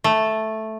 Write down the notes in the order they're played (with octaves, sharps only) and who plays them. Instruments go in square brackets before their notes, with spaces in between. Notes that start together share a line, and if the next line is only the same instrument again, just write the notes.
[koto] A3